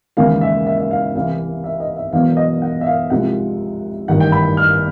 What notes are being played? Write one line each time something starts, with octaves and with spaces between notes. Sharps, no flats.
D#2 C#3 E3 G#3 F5
E5
E5
E5
F5
C2 C3 E3 F5
E5
D#5
E5
E1 E2 B2 F#3 F5
D#5
F#5
E5
F5
C2 C3 F3 G#3 F#5
A1 G2 D#3 F#5
G5
B5
F6